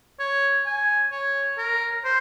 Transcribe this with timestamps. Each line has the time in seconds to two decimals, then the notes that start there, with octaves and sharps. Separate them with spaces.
0.19 C#5
0.66 G#5
1.11 C#5
1.58 A#4
2.04 C5